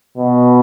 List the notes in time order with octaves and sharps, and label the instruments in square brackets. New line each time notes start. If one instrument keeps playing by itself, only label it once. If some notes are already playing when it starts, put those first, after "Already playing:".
[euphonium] B2